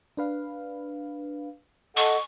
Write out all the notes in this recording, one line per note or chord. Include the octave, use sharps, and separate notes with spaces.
D4 B4 F5
A4 D#5 F#5 G#5 C#6